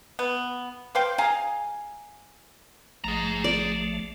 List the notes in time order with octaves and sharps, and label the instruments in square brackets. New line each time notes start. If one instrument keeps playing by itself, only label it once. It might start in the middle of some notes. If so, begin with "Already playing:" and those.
[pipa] B3
B4 C5 F5 G5
G#4 F5 G#5 A#5
[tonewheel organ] A1 F3 A3 [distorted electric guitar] G#4 A#5
[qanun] D5